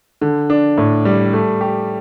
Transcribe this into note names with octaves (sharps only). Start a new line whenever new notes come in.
D3
D4
A2
G3
A3
G4